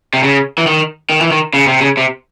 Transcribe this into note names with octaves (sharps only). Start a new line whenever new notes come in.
C3
C#3
E3
D#3
D#3
E3
D#3
C#3
C3
C#3
C3